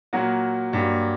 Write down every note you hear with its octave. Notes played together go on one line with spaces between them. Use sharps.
A#2 F#3 A#3 F#4
G2 F#3 A#3